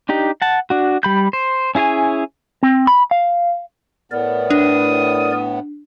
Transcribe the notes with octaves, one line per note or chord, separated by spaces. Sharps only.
D4 D#4 G4
F#5 A5
D4 F#4
G3 B5 G6
C5
C#4 E4 G#4 C#5 G#5
C4
B5
F5
A2 B3 A#4 D5
D4 D#6